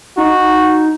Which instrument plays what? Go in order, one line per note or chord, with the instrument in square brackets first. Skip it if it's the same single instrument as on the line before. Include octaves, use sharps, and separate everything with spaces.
[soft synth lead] D#4 [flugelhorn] F#4